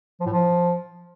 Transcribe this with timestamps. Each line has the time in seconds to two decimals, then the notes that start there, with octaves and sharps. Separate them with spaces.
0.20 F3
0.26 A2
0.33 F3